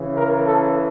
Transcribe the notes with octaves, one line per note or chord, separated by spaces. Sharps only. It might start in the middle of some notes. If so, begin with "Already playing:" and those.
Already playing: C#3 E3
A#4
A4